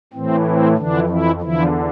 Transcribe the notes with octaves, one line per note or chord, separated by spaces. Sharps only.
A2 E3 C4
C4
F2 D3 E3 D4
E3 E4
E2 D3 E3 F3 E4